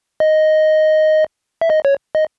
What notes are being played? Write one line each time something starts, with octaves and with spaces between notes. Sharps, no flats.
D#5
E5
D#5
C#5
D#5